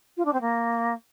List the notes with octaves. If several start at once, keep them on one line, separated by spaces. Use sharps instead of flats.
F4
D4
C4
A#3